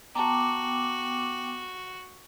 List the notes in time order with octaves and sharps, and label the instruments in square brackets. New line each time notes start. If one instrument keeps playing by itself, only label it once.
[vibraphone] B3 G5 D6 [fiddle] F#4 [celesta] A5 A#5